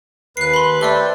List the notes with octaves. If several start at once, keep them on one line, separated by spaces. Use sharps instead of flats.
D#2 B4 F#6 C7
B5 C6
A3 G4 A4 D5 E5 G7
C5